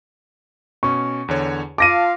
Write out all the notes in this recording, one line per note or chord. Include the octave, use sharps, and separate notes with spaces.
B2 C#4 C#6
E2 D3 C#5
F4 F5 A5 D6 A#6 D#7